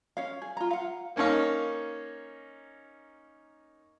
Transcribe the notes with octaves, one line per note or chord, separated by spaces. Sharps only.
C#4 C#5 F5
G#4
F4 A#5
F5 F#5
A#3 C#4 D#4 C#5 F5